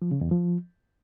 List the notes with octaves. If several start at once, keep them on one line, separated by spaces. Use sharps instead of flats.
F3
C#3
E2
F3